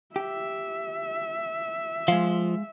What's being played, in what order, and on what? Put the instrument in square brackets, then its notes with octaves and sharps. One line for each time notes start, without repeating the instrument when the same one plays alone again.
[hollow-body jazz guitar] G4 [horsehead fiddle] E5
[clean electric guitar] F3 [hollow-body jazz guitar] G#3 F5